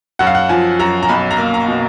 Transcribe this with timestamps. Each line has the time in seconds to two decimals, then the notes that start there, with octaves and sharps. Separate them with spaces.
0.19 F#2 F#5
0.27 F5
0.35 F#5
0.49 F3 G#5
0.79 F#2 A#5
1.03 A#5
1.09 B1 B5
1.31 A#5
1.38 A#3
1.54 A#5
1.68 B2